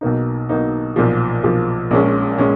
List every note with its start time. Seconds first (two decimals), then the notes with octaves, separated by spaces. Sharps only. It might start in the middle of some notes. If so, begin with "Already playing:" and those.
0.01 B1 B2 A#3 D#4
0.49 B1 B2 A#3 D#4
0.96 B1 A#2 F3
1.44 B1 A#2 F3
1.91 A#1 A#2 G#3 C#4
2.38 A#2 G#3 C#4